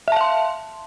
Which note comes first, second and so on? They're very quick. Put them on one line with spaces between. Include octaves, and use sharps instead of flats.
E5 A5 F5 C6